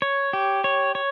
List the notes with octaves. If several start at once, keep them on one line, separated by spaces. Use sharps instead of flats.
C#5
G4
C#5
C#5